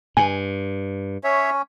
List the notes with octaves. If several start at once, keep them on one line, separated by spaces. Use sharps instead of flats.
G2 G#5
C#4 C#5 E5